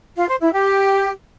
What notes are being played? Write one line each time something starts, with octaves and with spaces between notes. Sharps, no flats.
F4
C5
E4
G4